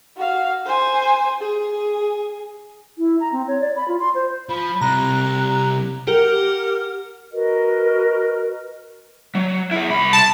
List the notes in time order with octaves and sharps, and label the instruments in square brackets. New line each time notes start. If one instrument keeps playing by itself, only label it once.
[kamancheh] F#4 F5
C5 G#5
G#4
[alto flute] E4
A#5
C4
C#5
D5
B5
F4
C6
C5
[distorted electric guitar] F3 [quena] B5
[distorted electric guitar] C3 G3 [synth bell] A#5 [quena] F#6
[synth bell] G4 A#4 [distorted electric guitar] F#5 [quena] F6
[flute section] F#4 A#4 B4 D#5
[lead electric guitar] F#3
E4 G#4
C2 B5
[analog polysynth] A5